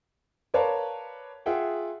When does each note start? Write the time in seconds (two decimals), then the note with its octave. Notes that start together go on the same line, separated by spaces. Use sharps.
0.54 A#4 B4 C#5 D5 F5 A5
1.46 F4 G#4 E5 F#5 G5